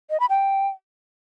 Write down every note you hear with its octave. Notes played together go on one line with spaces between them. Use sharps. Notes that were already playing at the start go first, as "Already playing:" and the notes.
D#5
B5
G5